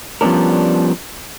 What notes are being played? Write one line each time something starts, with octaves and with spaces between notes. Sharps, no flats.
F3 G3 B3 C#4 D4 A#4